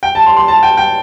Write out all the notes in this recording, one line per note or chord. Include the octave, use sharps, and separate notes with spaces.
G5
A5
C6
C6
A5
G5
G5